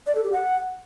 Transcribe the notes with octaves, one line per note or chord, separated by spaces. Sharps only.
D5
A4
G4
F#5